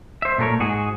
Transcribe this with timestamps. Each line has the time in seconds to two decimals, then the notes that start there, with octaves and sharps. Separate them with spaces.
0.22 C5 E5
0.38 A#2 A3 G4 A#4 C#5
0.60 G#2 F#4 G#4